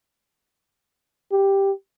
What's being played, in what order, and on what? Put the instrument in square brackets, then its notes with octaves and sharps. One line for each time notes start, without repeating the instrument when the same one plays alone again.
[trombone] G4